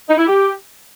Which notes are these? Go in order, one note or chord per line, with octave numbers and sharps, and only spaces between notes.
D#4
E4
G4